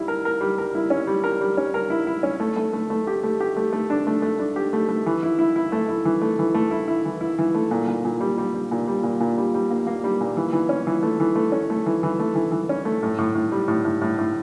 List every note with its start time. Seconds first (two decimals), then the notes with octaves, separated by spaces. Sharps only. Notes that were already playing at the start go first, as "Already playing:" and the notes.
Already playing: G3 E4
0.08 A#4
0.25 A#4
0.41 G3
0.58 A#4
0.75 E4
0.90 C#4
1.07 G3
1.24 A#4
1.41 G3
1.58 C#4
1.74 A#4
1.90 E4
2.07 E4
2.23 C#4
2.40 A3
2.56 A3
2.73 A3
2.90 A3
3.07 G4
3.23 A3
3.40 G4
3.57 A3
3.73 A3
3.90 D4
4.07 A3
4.22 A3
4.39 D4
4.56 G4
4.73 A3
4.89 A3
5.06 E3
5.23 E4
5.39 E4
5.56 E4
5.72 A3
5.89 E4
6.05 E3
6.22 A3
6.39 E3
6.54 A3
6.71 E4
6.88 E4
7.05 E3
7.21 E4
7.38 E3
7.55 A3
7.71 A#2
7.88 A#2
8.05 A#2
8.20 G3
8.38 G3
8.54 G3
8.71 A#2
8.87 G3
9.03 A#2
9.20 A#2
9.38 G3
9.54 G3
9.70 A#3
9.87 A#3
10.04 G3
10.21 A#2
10.37 E3
10.53 E3
10.69 C#4
10.87 E3
11.03 A3
11.20 E3
11.36 A3
11.52 C#4
11.70 A3
11.86 E3
12.03 E3
12.19 A3
12.35 E3
12.52 E3
12.69 C#4
12.85 A3
13.03 A2
13.18 A2
13.35 A2
13.52 G3
13.68 A2
13.85 A2
14.01 A2
14.18 A2